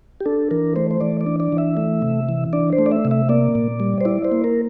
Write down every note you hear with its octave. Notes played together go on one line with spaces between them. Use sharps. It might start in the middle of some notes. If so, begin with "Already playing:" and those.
G4
D4 A4
E3 A#4
A3 C5
C5
E3 D5
D5
D4
D5
E3
E5
A3
C3
E3
D4 D5
C5
A3
D5
E5
C3
E5
A#3 D5
A#2
G3
C5
E4 D5
C5
A#3
A#4